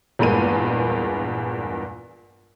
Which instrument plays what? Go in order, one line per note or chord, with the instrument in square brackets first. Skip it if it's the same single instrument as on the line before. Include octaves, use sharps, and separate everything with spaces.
[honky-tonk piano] A#1 E2 G2 G#3 A#3 D#7